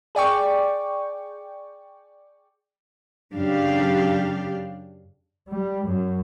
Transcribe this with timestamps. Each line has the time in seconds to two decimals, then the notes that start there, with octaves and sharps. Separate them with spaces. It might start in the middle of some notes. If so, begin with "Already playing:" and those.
0.15 G#4 D5 G5 C#6
3.34 F#2 C#3 D4 G4 F5
5.50 G3
5.87 F#2